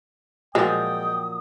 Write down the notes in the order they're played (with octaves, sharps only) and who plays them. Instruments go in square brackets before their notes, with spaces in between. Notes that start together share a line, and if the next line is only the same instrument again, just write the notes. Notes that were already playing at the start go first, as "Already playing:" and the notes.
[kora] A#2 F3 F#3 [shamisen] G#3 [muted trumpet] G5 [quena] D#6